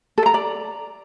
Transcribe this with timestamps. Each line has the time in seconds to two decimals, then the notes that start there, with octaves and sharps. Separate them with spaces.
0.18 A4
0.26 A#5
0.34 D5